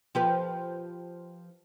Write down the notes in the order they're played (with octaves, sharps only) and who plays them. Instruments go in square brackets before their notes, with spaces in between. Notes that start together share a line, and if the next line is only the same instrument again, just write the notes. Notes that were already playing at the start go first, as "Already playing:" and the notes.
[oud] F3 G4 B4